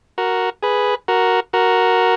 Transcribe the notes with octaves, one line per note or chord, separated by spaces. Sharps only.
F#4 A#4
G#4 B4
F#4 A#4
F#4 A#4